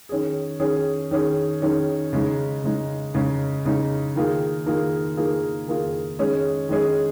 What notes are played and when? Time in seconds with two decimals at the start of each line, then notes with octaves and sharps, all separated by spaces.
0.09 D#3 C#4 G#4
0.60 D#3 C#4 G#4
1.11 D#3 C#4 G#4
1.62 D#3 C#4 G#4
2.13 C#3 G#3 D#4
2.63 C#3 G#3 D#4
3.14 C#3 G#3 D#4
3.65 C#3 G#3 D#4
4.16 D#3 A#3 F4 G#4
4.66 D#3 A#3 F4 G#4
5.17 D#3 A#3 F4 G#4
5.68 D#3 A#3 F4 G#4
6.19 D#3 G#3 C#4 G#4
6.69 D#3 G#3 C#4 G#4